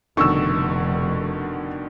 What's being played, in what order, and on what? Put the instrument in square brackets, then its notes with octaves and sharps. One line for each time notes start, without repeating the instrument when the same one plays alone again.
[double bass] F1 [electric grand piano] B2 D3 D#3 [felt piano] C#6 E6